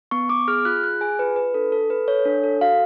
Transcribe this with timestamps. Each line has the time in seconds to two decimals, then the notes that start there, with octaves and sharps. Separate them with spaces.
0.11 B3 C#6
0.29 B3 D6
0.48 G#4 F6
0.65 F4 F#6
0.83 G#4 F#6
1.01 G#4 G#5
1.19 F4 B4
1.36 F4 B4
1.54 D4 A4
1.72 A4
1.90 A4 B4
2.08 A4 C#5
2.25 D4
2.44 A4
2.61 F#4 F5